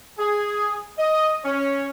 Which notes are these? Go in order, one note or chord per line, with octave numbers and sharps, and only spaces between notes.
G#4
D#5
C#4